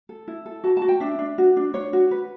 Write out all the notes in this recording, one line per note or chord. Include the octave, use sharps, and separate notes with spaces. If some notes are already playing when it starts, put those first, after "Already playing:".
A4
E4
A4
F#4 A5
A5
F#4
G5
D4 E5
D4
F#4
D4
D4 C#5
F#4
B4